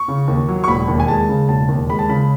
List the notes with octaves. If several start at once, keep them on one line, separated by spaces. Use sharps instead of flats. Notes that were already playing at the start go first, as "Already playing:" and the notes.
Already playing: C#6
C#3
D#2
F#3
C#6
E1 B5
D#2
G#5
G#3 A5
C#3
E1 A5
D#2
G#3 B5
A5
C#3 B5